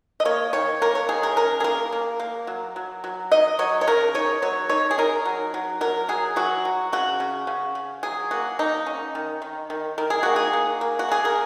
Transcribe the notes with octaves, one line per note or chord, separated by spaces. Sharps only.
D#5
A#3 C#5
D#3 C#5
A#3 A#4
C#5
D#3 G#4
A#4
C#4 A#4
G#4
A#3 A#4
A#3
A#3
F#3
F#3
F#3
D#4 D#5
F#3 C#5
C#5
C#3 A#4
D#4 C#5
F#3 C#5
D#4 C#5
G#4
D#4 A#4
F#3
F#3
F#3 A#4
F#3 G#4
F#3 F#4
F#3
C#3 F#4
C#3
C#3
C#3
F#3 G#4
A#3 F#4
A#3 D#4
C#4
D#3
D#3
D#3
D#3 A#4
G#4
A#3 F#4
G#4
A#3
A#3
F#4
A#3 G#4
A#4